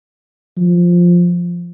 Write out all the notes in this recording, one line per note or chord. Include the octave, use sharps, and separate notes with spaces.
F3